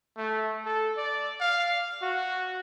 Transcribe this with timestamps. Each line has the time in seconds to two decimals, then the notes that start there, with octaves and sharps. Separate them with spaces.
0.17 A3
0.66 A4
0.97 D5
1.41 F5
2.02 F#4